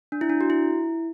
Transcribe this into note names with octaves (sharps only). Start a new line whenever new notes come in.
D4
E4
D4
F#4
E4